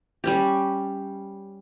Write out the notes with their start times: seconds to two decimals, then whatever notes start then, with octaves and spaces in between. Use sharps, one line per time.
0.24 G3 C#4 G4